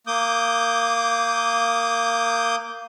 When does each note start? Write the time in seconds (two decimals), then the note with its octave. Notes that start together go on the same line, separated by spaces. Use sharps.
0.07 A#3 D6 D#6 G6